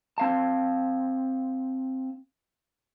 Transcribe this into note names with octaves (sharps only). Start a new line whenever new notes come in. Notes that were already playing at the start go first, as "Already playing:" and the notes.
C4 F5 A5